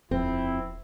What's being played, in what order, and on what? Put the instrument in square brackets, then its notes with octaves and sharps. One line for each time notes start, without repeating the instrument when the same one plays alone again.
[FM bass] D#1 [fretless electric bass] F2 [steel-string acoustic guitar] C4 [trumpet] E4